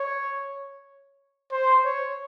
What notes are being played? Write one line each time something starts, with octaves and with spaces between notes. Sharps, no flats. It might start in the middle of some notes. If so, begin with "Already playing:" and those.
Already playing: C#5
C5
C#5